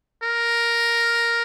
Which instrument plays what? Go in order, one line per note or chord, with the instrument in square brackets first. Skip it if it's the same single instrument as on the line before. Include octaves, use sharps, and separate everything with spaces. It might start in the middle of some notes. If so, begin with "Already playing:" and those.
[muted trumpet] A#4